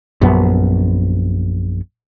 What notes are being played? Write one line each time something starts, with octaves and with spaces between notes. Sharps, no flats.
A#1 F#2 B3